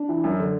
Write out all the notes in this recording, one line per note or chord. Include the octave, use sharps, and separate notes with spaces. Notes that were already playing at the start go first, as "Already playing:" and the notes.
Already playing: D4
E3
F#2
D3